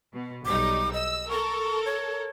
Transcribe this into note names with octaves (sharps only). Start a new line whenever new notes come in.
B2
B1 G3 D#4 D6
D#5 E6
A4 A#4 C#6
C#5